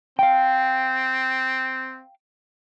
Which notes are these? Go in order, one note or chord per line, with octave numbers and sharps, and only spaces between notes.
C4 F5 G5